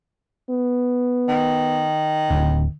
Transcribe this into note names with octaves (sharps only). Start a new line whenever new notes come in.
B3
D#3
D1